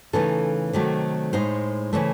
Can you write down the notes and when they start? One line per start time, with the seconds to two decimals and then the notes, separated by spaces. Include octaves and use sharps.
0.13 C#3 E3 A3 D#4 A4
0.73 C3 D#3 F#3 A3
1.33 A2 G#3 D#4 C5
1.93 C#3 E3 A3